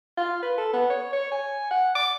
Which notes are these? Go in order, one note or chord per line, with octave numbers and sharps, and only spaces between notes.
F4
B4
A4
B3
C#5
C#5
G#5
F#5
D6